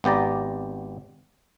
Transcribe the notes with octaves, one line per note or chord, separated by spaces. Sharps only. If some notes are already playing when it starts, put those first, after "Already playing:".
G#1 B3 G4 D5 A#5